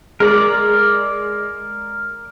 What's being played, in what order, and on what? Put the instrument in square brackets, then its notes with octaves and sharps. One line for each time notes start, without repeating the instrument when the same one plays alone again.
[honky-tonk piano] G#3 [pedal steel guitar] A#4 D5